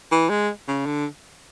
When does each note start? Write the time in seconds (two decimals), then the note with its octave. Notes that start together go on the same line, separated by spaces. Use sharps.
0.12 E3
0.29 G#3
0.68 C#3
0.86 D3